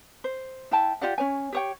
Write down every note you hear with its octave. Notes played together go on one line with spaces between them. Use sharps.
C5
E4 G5 A5
F4 G4 D5 F#5
C#4 C#5 G#5
G4 C#5 G5